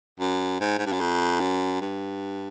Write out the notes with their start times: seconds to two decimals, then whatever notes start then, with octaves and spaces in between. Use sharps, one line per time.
0.20 F#2
0.61 G#2
0.79 G#2
0.86 G2
0.92 F#2
1.00 F2
1.40 F#2
1.81 G2